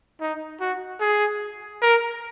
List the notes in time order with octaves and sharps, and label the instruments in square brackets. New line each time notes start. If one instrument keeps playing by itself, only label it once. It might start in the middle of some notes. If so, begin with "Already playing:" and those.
[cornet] D#4
F#4
G#4
A#4